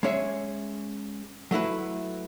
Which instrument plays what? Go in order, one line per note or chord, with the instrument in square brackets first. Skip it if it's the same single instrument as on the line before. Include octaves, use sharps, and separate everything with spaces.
[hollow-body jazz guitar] G#3 C#4 G#4 C#5 E5
F#3 A3 E4 B4